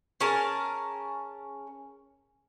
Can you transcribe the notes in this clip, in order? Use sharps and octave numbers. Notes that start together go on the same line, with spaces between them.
C#4 G#4 A#4 A5